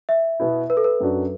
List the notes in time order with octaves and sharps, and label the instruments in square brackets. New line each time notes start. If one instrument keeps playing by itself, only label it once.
[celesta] E5
[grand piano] B2 B3 E4
[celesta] B4
A4
B4
[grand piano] F#2 F#3 D4 F#4